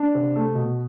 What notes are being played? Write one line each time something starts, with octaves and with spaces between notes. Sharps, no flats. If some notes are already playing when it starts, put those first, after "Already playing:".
Already playing: D4
C3
A3
B2